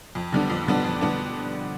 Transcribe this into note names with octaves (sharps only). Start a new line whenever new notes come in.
F2
D3 G3 B3 D4
F2
D3 G3 B3 D4
F2
D3 G3 B3 D4